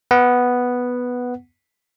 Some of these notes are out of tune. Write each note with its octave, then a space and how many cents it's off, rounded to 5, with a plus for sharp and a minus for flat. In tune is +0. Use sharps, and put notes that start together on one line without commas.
B3 +0 F#5 +0